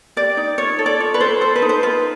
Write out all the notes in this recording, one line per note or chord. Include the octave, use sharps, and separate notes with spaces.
G4 D5
D#4
F4 C#5
A4
D5
F4 C#5
B4
A4 C5
A4 C5
B4
D#4
C5
F4 B4